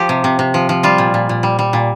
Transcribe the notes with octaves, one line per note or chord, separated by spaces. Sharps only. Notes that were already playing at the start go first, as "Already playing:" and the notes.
Already playing: F3 G4
C3
C3
C3
F3
F3
G3 F4
A#2
A#2
A#2
G3
G3
A#2